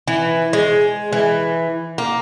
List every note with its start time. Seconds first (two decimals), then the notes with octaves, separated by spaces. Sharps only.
0.08 E3
0.53 G#3
1.13 E3
1.98 A#3